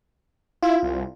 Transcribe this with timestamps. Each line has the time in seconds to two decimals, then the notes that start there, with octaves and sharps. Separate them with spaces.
0.63 E4 F4
0.83 C2